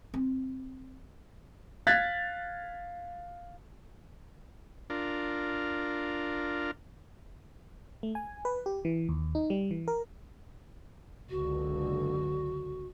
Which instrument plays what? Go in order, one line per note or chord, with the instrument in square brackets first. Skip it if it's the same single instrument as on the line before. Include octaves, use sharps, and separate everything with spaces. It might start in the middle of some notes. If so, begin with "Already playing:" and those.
[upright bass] C4
[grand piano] F5 F#6 G#6 A6 B6
[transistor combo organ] D4 F4 A#4
[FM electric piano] A3
G#5
B4
G4
E3
D#2
D#4
G3
E3
A#4
[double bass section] F#1 C#2 D3 [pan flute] F#4